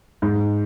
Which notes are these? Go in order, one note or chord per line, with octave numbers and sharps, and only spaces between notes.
G#2